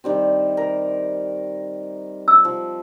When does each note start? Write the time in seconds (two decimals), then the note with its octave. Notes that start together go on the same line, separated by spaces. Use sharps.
0.04 D#3 G3 C4
0.57 A#4
2.28 E6
2.45 F3